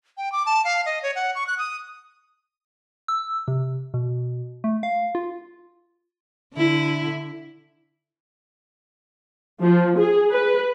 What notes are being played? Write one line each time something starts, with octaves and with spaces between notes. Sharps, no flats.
G5
D6
A5
F5
D#5
C#5
F#5
C#6
F#6
D#6
E6
C3
B2
A3
F5
F4
D3 E4
F3
G#4
B4